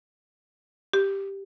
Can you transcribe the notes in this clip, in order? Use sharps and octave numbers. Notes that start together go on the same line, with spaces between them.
G4